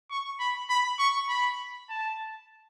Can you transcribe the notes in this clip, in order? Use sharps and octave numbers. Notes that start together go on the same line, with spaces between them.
C#6
B5
B5
C#6
B5
A5